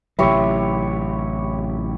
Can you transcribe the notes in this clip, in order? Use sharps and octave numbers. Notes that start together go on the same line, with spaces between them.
A1 C3 F#3 E4 G4 C#5